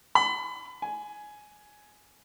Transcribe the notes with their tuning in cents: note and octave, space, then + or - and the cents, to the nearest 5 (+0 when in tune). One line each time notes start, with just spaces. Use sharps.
B5 +30
G#5 +10